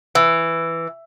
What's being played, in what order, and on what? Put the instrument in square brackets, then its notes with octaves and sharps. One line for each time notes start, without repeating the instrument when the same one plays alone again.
[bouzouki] E3